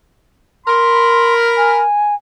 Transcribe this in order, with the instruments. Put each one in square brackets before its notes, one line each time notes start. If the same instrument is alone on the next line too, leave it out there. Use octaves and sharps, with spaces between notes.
[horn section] A#4 B5 [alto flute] C6
[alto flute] G#5